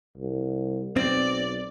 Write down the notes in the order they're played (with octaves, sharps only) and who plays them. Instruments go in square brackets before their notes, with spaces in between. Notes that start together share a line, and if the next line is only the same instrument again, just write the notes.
[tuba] C2
[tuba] B1 [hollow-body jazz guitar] C4 [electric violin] D5